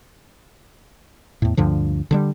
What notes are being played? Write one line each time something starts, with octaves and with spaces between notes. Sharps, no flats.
E2 A2
D2 G2 D3 F3
D3 F#3 G3